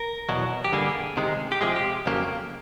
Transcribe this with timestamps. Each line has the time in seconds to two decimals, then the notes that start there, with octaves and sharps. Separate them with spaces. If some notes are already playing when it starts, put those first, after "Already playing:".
Already playing: A#4
0.29 E2 B2 F#3
0.65 G4
0.72 G2 D3 G3 A#3 G#4
1.17 C3 D#3 G#3
1.52 G4
1.61 C3 F3 G#3 G#4
1.76 G4
2.06 F2 C#3 F#3 A#3